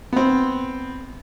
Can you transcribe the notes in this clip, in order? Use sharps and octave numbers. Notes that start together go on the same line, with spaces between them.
B3 C4